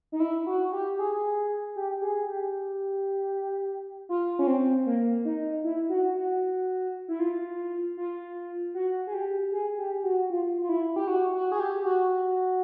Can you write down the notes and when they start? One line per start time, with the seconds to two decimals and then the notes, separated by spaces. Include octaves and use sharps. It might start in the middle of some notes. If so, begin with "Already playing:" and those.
0.12 D#4
0.20 E4
0.46 F#4
0.72 G4
0.99 G#4
1.76 G4
2.02 G#4
2.27 G4
4.09 F4
4.39 C#4
4.47 C4
4.86 A#3
5.25 D#4
5.64 E4
5.89 F#4
6.15 F#4
7.08 E4
7.19 F4
7.97 F4
8.74 F#4
9.07 G#4
9.14 G4
9.52 G#4
9.78 G4
10.04 F#4
10.30 F4
10.61 F4
10.69 E4
10.96 G4
11.08 F#4
11.34 F#4
11.52 G#4
11.60 G4
11.85 F#4